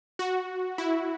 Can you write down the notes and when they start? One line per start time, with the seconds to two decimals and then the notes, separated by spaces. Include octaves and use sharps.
0.19 F#4
0.78 E4